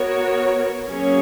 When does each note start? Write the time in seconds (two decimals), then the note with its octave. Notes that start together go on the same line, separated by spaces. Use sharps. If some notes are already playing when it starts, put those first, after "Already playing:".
Already playing: B3 F#4 A#4 C#5
0.88 F#3 A#3 C#4 G#4 C#5